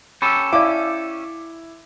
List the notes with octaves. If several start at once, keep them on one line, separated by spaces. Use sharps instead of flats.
C#4 G4 A4 B5 E6
E4 D5 F5 F#5 D6